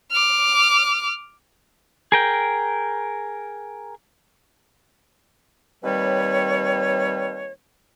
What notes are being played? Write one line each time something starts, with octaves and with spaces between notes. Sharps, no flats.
D6 F6
G#4 A#4 G5
D#2 G3 C4 B4 C#5